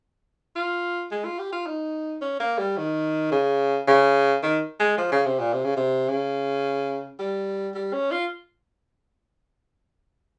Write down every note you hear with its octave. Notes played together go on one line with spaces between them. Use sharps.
F4
G#3
F4
G4
F4
D#4
C#4
A#3
G3
D#3
C#3
C#3
D#3
G#3
F3
C#3
C3
A#2
C3
C#3
C3
C#3
G3
G3
C#4
F4